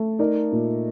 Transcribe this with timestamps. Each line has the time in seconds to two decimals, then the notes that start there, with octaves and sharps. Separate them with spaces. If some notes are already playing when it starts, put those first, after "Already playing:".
Already playing: A3
0.19 D#4 A#4 D5
0.52 A#2